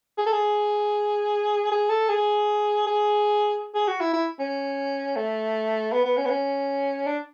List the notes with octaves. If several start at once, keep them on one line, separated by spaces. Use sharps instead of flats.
G#4
A4
G#4
G#4
A4
G#4
G#4
G#4
F#4
E4
E4
C#4
A3
B3
B3
C#4
B3
C#4
D4